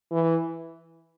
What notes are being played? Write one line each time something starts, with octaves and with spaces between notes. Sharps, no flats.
E3